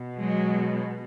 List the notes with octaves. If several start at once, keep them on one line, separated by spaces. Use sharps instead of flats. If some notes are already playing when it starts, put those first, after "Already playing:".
Already playing: B2
F#3 G#3